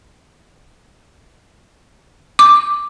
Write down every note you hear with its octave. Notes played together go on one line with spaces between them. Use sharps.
D6